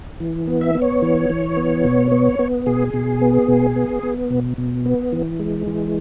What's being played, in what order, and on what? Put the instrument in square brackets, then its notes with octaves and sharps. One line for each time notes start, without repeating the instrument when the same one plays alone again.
[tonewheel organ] E3
B3
E5
B3
C#5
E3
E3
B3
B2
B3
B3
B2 G#4
B2
B3
B2
B3
B3
B2
B2
B3
E3
G#3
E3